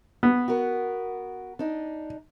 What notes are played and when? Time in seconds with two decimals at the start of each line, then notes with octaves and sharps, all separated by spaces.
0.23 B3
0.48 F#4 A#4
1.59 D4 D#4